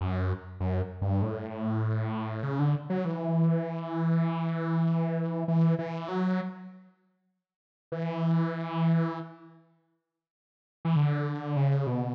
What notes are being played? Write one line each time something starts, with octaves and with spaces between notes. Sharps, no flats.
F#2
F#2
G2
A2
C#3
D3
F#3
E3
E3
E3
F#3
E3
E3
D3
C#3
B2